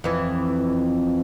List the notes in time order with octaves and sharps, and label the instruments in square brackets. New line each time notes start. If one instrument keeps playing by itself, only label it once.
[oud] F2 E3